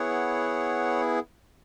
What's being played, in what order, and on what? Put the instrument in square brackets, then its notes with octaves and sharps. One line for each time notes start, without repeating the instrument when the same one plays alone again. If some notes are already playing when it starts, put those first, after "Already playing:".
Already playing: [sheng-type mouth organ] B3 E4 G#4 C#5 F#5